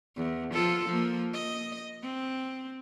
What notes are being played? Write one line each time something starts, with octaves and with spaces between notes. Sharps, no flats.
E2
F3 F4 A4
F3 A#3
D#5
C4